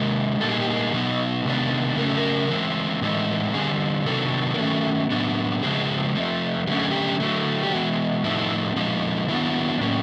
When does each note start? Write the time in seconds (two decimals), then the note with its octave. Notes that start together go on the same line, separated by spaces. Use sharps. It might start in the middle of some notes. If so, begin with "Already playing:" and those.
Already playing: C3 D#3 G#3
0.40 A#2 G3 A#3 D#4 A4
0.51 G#4
0.61 G4
0.70 G#4
0.93 B2 F#3 B3 D#4
1.45 C3 D#3 G#3 B3 D4
1.97 C#3 F#3 A3 C#4 A#4
2.08 A4
2.17 A#4
2.49 E3 G#3 C4
3.01 A2 E3 G#3 C4 D#4
3.54 D3 G3 C4 G#4
4.05 C3 D#3 F#3 B3 D4 A4
4.54 A#4
4.58 D#3 F#3 A3 C#4 A4
5.10 A2 F#3 B3 D4
5.62 C#3 F3 G#3 C4 G#4
6.15 F3 A3 C4
6.67 D3 F#3 A3 C#4 G4
6.79 G#4
6.91 G4
7.20 D3 F#3 A3
7.63 G4
7.72 E3 G#3 B3 F#4
8.23 A2 F3 A3 C4 D#4 E4
8.76 A#2 F3 G#3 C4 D#4
9.28 D#3 F#3 B3 D4 E4
9.81 A2 F#3 A#3 C#4